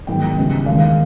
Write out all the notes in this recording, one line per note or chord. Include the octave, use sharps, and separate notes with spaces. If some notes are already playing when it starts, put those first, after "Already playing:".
G#2 D#3 F#3 B3 G5
C#2 C#3 E3 G3
D#2 D#3 G#3 F5